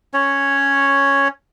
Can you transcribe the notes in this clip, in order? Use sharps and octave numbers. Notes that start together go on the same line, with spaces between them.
C#4 C#5